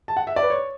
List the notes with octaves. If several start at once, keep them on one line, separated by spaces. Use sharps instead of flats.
A5
F#5
E5
D5
B4
C#5